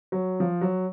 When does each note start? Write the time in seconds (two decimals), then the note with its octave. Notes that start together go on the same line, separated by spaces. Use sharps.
0.12 F#3
0.40 F3
0.61 F#3